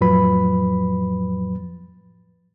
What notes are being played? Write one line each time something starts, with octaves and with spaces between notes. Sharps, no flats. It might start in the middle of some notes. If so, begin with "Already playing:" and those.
F2 A2 F3 F#3 B4 B5